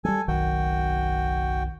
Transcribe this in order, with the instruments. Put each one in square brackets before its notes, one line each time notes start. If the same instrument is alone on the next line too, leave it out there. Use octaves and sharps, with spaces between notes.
[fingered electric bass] F#3 G3 [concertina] A4 G#5
[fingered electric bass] F#1 B1 D#3 [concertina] F#4 G5